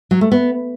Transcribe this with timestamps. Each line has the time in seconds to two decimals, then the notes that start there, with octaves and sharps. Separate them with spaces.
0.11 F#3
0.21 A3
0.32 B3